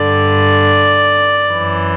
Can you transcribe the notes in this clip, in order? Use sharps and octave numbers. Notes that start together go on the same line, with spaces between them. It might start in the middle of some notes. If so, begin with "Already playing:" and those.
Already playing: G2 D3 D5
F#2 E3